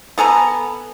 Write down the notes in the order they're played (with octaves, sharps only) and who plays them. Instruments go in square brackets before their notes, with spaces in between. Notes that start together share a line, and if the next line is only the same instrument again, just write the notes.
[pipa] B3 A4 G#5 A#5